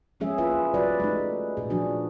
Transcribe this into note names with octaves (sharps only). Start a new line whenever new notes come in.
F3 G#3 C#4 G#4 E5
A#3 E4 F4 G#4 B4 E5
G3 F#4 B4 D5
G#3 A3 D#4
A#2 G#4
F3 D4 F#4